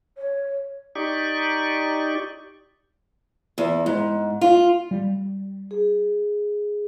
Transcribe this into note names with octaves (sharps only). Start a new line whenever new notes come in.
C#5
D#4 G4 D5 C#6
E2
G#2
F4
G3
G#4